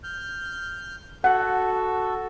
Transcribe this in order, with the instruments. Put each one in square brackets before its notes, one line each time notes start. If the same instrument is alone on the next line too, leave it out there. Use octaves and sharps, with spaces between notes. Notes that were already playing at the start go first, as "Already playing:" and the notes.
[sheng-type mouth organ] F6 G6
[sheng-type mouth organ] F#4 A4 [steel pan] F#5